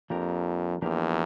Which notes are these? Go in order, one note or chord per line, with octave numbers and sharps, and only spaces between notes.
F2 F3 A#3 D4 G4 A#4
E2 F3 A#3 D4 G4 A#4